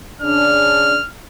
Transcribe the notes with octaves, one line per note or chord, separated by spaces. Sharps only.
C#3 D4 F6